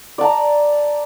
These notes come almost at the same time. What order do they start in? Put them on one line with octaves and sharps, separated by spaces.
D5 A5 A#5